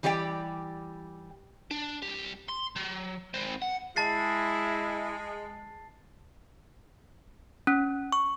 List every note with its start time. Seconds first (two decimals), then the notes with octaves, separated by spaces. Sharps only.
0.03 E3 G3 G4 D5 G5
1.71 D4
2.03 C2 G4
2.49 C6
2.76 F#3
3.34 G#3 C4
3.62 F#5
3.96 G#3 E4 A5 A6 C7
7.67 C#4
8.12 C#6